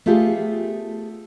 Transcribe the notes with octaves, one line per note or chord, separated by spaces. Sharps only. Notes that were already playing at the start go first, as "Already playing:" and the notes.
A3 B3 F4 G4 G#4